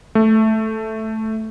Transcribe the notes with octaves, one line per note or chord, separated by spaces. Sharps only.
A3